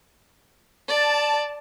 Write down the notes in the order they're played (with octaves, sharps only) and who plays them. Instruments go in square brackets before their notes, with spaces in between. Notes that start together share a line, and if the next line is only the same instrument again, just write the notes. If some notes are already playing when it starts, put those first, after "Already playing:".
[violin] D5 [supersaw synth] A5